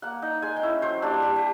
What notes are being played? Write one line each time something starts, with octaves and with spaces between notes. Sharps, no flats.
A#3 F#5
D#4
G#3 G#5
G5
C#4 E4
F#3 C5
A#3 D4 G4
G3 G4
G4